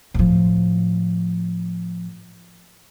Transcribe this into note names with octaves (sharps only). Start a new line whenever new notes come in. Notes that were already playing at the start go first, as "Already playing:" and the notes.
A2 F3